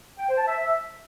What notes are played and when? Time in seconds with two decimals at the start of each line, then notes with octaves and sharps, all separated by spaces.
0.18 G5
0.28 C5
0.38 A5
0.47 E5